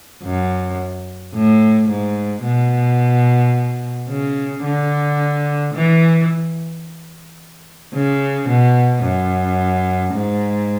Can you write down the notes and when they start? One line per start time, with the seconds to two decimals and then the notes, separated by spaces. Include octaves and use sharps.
0.24 F#2
1.34 A2
1.90 G#2
2.44 B2
4.09 C#3
4.64 D3
5.75 E3
7.94 C#3
8.49 B2
9.04 F#2
10.14 G#2